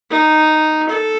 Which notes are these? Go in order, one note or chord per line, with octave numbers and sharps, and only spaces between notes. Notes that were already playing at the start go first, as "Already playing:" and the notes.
D#4
A4